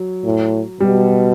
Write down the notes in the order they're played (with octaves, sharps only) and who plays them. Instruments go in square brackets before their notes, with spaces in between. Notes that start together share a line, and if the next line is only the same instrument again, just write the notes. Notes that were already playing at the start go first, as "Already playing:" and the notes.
Already playing: [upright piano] F#3
[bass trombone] A2
[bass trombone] B2 [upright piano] G3